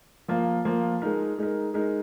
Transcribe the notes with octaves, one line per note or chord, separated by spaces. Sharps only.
F3 A#3 F4
F3 A#3 F4
G#3 D#4 A#4
G#3 D#4 A#4
G#3 D#4 A#4